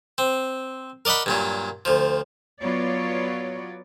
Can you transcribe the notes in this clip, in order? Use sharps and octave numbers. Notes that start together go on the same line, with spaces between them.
C4
A#4 D5 D#5 F#5 B5
G2 A#2 F#3
D2 F3
F#3 B3 F4 C#5 D5